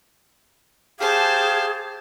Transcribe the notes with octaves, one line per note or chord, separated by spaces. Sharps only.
G4 G#4 C5 F5 A5